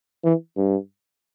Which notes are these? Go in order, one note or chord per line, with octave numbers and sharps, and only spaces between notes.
E3
G2